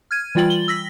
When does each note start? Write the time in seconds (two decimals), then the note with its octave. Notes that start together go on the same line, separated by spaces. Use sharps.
0.11 F6 G#6 D#7
0.35 E3 G3 F4 G5 A6 F#7
0.50 G7
0.68 E6 A#6 B6